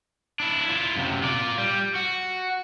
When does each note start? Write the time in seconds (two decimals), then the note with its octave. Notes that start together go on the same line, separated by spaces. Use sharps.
0.40 D4 E4
0.67 E4 F4
0.96 F#2 C3
1.22 F4 D5
1.58 G3
1.95 F#4